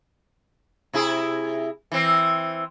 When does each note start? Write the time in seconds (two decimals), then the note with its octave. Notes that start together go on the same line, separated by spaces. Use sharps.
0.93 C3 E4 G#4
1.92 E3 C4